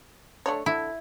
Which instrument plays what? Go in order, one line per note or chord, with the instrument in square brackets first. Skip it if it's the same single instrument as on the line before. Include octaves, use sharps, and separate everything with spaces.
[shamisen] A3 D4 C#5
[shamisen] D3 [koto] E4